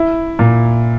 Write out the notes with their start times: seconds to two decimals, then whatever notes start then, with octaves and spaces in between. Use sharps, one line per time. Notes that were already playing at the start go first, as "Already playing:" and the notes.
Already playing: E4
0.39 A#2